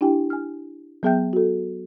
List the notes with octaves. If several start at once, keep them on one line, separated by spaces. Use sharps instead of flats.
D4 E4 G4 G5 G#5
G#5 F6
F#3 B3 G#4 E5 G5 G6
F#4 A4